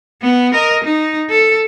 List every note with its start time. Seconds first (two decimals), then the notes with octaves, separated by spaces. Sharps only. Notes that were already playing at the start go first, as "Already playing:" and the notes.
0.21 B3
0.54 A#4 D#5
0.84 D#4
1.30 A4